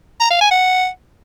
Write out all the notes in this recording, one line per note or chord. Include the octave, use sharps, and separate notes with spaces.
A#5
F5
G#5
F#5